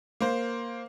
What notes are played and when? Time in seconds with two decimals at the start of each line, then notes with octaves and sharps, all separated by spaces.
0.21 A#3 C5